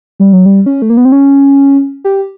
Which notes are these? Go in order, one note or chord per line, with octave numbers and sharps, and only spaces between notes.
G3
F#3
G3
C#4
A3
A#3
B3
C4
C#4
G4